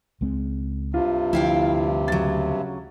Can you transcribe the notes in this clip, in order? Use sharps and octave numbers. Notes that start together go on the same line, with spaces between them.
C#2 G#3 C4
G2 C3 F4
D2 F3 E4 F5 G5
C#3 F#3 A6